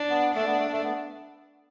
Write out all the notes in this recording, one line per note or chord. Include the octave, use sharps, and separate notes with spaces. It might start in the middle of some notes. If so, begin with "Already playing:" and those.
Already playing: D4
B3
A3 D4
B3
A3
A3
B3